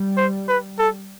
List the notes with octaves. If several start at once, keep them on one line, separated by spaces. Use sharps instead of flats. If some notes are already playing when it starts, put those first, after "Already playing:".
Already playing: G3
C5
B4
A4